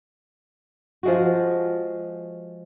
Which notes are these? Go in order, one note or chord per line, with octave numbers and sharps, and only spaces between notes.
F3 G#3 F#4